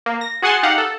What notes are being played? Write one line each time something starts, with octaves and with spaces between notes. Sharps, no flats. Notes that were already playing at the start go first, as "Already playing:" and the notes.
A#3
A#6
F#4 G#4 F#5 G#5 A5 C6
D#4 G4 F5 F#5
A4